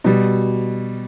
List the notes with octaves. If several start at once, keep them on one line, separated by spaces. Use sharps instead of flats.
B2 G3